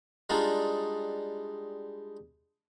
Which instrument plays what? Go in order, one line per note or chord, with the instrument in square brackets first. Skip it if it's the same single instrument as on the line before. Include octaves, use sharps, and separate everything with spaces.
[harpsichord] G3 G#3 D4 D#4 F4